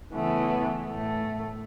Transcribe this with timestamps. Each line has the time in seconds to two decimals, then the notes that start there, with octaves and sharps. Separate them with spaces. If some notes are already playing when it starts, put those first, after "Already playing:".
0.13 C#3 E3 A3 B3
0.89 A2 A3